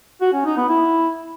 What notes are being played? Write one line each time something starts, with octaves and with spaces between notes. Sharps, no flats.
F#4
C#4
D#4
B3
E4